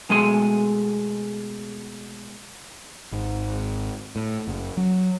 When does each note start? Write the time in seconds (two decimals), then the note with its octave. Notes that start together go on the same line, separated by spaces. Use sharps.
0.09 B2 G#3 A3 G#4 C6
3.12 G#1
4.16 A2
4.48 F#1
4.77 F#3